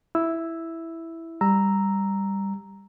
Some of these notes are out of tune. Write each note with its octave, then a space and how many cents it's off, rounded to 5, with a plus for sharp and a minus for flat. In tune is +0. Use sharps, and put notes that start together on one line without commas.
E4 +0 E6 +0
G3 +10 A#5 +0 E6 +0